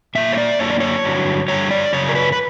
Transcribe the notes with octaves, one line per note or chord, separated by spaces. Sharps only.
A#2 A#3 E5
C#5
D5
F#2 D3 A#3 C#5
D5
C#5
G2 D3 F#3
G2 D3 G3 C#5
D5
F#2 C#3 C#5
A#4
B4
B4